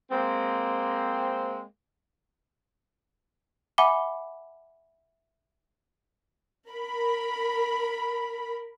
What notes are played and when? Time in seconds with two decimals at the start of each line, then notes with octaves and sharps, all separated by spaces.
0.11 G#3 A#3 C4
3.78 E5 F#5 G#5 B5 D6 G7
6.70 A#4 B5